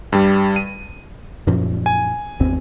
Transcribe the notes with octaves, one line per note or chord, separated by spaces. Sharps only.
G2 G3
D#7
F#2 A#2 F3
G#5
G#1 E2 C4